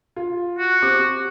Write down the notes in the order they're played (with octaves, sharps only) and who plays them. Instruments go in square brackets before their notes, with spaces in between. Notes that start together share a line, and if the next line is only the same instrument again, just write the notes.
[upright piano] F4
[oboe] F#4
[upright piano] C4 G4 D6